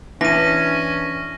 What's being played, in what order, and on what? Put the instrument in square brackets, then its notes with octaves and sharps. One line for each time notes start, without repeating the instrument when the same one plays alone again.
[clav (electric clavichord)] E3 [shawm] C#4 [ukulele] D4 [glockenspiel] A#6 D#7